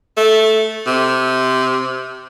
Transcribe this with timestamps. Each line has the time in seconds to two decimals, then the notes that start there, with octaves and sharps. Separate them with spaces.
0.17 A3
0.87 C3